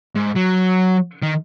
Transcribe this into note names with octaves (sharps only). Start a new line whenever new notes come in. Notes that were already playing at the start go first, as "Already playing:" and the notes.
G#2
F#3
D#3